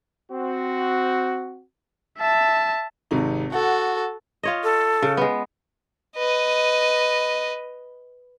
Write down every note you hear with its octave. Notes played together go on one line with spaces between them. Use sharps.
C4 F#4
E5 A5
G#1 C3 D#4
F#4 A4 F#5
F4 C#5 D#5
A4
C#3
G#3 B3
B4 D#5